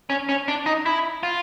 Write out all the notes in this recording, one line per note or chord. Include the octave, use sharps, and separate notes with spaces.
C#4
C#4
D4
D#4
E4
F4